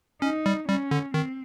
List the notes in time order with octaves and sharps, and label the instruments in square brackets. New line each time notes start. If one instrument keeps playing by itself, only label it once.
[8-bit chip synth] C#4 [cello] D#4
[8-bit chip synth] G3
[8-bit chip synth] G3 [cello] C#4
[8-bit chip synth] D3
[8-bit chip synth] D#3 [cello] C4